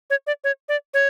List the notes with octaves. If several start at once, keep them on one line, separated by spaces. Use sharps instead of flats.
C#5
D5
C#5
D5
C#5